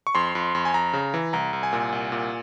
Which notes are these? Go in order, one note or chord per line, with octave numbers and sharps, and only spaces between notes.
C#6
F2 C6
F2
F2
G#5
F2 A#5
C#3
E3
C2 A#5
C2
G#5
A#2
C2
A#2